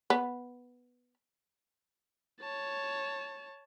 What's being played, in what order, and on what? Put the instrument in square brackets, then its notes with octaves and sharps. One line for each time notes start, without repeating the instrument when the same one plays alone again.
[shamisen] B3
[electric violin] C#5 A5